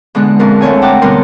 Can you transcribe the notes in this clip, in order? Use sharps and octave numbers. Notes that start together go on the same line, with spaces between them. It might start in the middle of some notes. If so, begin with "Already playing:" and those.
B2 D3 G#3 D4 F#6
F2 A#2 F4 A#4
D2 A3 C#5 G#5
F#5 G5 A5 A#5 D6 F#6
B2 D3 G3 A#4 C#5 C6